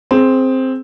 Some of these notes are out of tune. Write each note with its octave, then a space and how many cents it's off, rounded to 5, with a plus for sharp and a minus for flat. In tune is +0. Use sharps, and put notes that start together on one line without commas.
C4 +0 G#4 +20